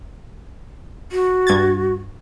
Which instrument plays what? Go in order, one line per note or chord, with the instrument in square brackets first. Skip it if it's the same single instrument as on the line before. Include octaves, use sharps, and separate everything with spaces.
[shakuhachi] F#4
[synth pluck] G2 G#6 A6